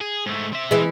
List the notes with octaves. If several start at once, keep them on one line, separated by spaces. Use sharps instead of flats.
G#4
G#2 A3
C4 E5
E3 G#3